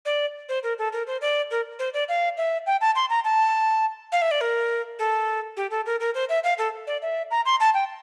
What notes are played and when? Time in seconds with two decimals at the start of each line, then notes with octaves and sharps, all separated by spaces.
0.05 D5
0.49 C5
0.63 A#4
0.78 A4
0.92 A#4
1.07 C5
1.21 D5
1.51 A#4
1.79 C5
1.94 D5
2.09 F5
2.37 E5
2.66 G5
2.81 A5
2.95 C6
3.10 A#5
3.24 A5
4.12 F5
4.22 E5
4.31 D5
4.41 A#4
4.99 A4
5.57 G4
5.71 A4
5.86 A#4
6.00 A#4
6.14 C5
6.29 E5
6.44 F5
6.58 A4
6.87 D5
7.02 E5
7.31 A#5
7.45 C6
7.60 A5
7.74 G5